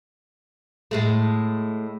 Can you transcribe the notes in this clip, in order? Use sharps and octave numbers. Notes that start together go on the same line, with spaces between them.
A2 G#3 A3